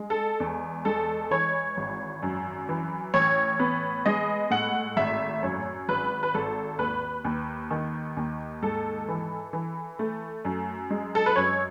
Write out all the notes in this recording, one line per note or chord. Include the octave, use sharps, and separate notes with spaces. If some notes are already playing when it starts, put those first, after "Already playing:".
Already playing: G#3
A4
E2
G#3 A4
E3 C#5
G#1
F#2
E3
A1 C#5
B3
G#3 D#5
A2 F#5
G#1 E5
F#2 C#5
G#1 B4
B4
G#1 A4
D#2 B4
D#2
D#3
D#2
G#2 A4
E3
E3
A3
F#2
G#3
A4
B4
F#2 C#5